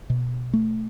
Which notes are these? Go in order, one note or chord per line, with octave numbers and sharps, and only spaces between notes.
B2
A3